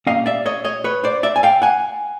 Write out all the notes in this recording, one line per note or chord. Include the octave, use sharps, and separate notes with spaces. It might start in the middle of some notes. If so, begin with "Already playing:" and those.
A#2 G3 A#3 C#4 D#5 F5
D5 E5
C#5 D#5
C#5 D#5
B4 C#5
C5 D5
D5 E5
G#5
F5 G5
F#5 G#5